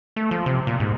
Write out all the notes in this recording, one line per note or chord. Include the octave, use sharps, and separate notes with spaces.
A3
F3
C3
A#2
G#2